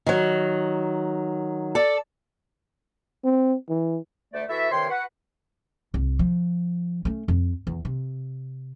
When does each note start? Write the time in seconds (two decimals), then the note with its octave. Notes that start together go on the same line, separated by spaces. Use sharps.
0.06 D#3 F#3
1.75 A4 D5
3.24 C4
3.69 E3
4.34 D2 A3 D5
4.49 E3 E4 F#4 A4 E5
4.71 G2 C3 D#3 C#5 G5 C6
4.90 F#4 B4 F#5
5.94 C2
6.19 F3
7.05 A3 C#4
7.28 F2
7.67 E2
7.85 C3